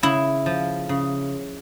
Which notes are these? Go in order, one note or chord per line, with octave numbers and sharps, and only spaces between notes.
C#3 E4
F3
C#3